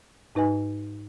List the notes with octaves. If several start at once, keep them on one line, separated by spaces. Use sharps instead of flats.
G#2 D#4 B4 D#5 G#5